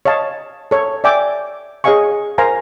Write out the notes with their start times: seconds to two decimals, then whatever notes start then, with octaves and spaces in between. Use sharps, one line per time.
0.05 C#5 D#5 F5 A5
0.71 A4 C#5
1.04 D5 E5 G5 G#5 D6
1.84 G#4 C#5 D#5 F5 G#5 C#6
2.38 A#4 C5 F5 G#5 A#5